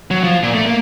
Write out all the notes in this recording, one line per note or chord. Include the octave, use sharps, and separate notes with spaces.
F#3
F3
A#2
A3
A#3